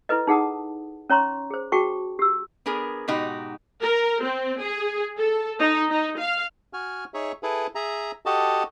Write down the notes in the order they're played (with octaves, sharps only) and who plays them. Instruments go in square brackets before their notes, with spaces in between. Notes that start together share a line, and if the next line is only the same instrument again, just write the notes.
[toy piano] E4 A4 B4 D#5
D#4 G#4 F#5 A5 D#6
C#4 C#5 A#5 C6 C#6
G#4 C5
F#4 G#4 G5 A5 C#6
G4 E6
[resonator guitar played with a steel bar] B3 D4 G#4 A#4
G#2 B2 D#4 F#4 G4
[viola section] A#4
C4
G#4
A4
D#4
D#4
F5
[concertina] F#4 G#5 F6
D#4 G#4 C#5 E5
E4 G#4 A4 B4
G#4 E5 A#5
F#4 G4 A4 D#5 A5